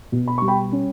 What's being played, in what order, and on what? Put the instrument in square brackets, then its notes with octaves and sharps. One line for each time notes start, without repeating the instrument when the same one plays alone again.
[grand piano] B2
B5
G3 C#6
G5 B5
C#4